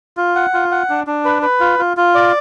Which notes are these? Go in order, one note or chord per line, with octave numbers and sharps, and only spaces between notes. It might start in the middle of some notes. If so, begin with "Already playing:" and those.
F4
F#5
F4
F#5
D4
D4
B4
B4
F4
F4
F4
D5